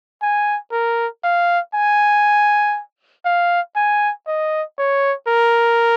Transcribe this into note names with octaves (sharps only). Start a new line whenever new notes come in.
G#5
A#4
F5
G#5
F5
G#5
D#5
C#5
A#4